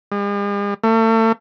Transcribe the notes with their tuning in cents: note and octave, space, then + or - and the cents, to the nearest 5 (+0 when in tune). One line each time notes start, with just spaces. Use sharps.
G#3 -45
A3 +35